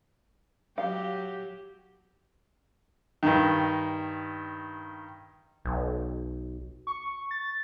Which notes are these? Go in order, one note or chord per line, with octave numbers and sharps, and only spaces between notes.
F#3 G4 F5
G2 D#3
B1
C#6
A6